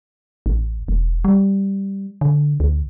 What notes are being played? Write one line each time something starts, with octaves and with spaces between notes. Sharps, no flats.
A1
E1
G3
D3
D2